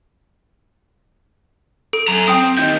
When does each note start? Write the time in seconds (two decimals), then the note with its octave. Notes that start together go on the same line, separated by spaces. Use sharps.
1.93 A4 D7
2.08 F#2 A#5
2.28 C4 G5 D#6
2.57 D#2 D#3 G6